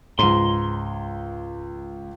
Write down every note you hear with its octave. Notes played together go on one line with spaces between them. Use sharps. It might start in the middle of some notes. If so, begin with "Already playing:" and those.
C#2 G#2 A#5 C6